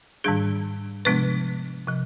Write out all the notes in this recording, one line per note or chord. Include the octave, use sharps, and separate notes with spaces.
G#2 D#3 G3 D4 G#4
C3 F3 G#3 B3 D4 B4
C3 F3